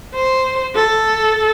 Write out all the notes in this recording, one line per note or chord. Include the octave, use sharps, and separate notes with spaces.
C5
A4